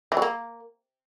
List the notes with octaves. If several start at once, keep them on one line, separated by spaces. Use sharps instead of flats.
E3
F#3
A#3